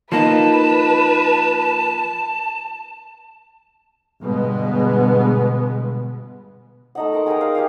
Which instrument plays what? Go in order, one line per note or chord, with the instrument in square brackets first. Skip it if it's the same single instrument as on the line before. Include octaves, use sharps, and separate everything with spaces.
[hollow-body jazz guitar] F3 A#3 D#4 [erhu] B4 [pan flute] A5
[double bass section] G1 B2 G#3 B3
[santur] A3 D#4 F#5
A#4 F#5 C6
G#4 A#4 G5 A#5
F5
G4 G#4 A#4 F5